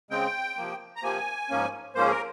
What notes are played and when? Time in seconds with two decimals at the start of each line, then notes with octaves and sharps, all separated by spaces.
0.11 C#3 G#3 C4 G5
0.57 C3 F3 A#3
0.96 A#5
1.03 C3 F3 A#3 G#5
1.50 G#2 F3 A#3 C#4
1.95 G#2 F3 A#3 C#4 C5
2.05 G#4
2.11 A#4